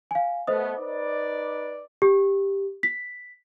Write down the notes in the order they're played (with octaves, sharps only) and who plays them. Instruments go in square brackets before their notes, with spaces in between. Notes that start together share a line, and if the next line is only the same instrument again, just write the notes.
[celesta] F5 G#5
[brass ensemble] A3 B3 [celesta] C5 D#5 D#6
[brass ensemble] D#4 B4 D5
[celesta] G4
B6